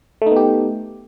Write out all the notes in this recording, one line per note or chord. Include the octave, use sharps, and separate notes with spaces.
A3 B3 D#4 G4